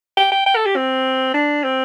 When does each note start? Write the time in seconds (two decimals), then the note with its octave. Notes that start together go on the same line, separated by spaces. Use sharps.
0.17 G5
0.32 G5
0.46 G5
0.56 A4
0.66 G4
0.76 C4
1.34 D4
1.64 C4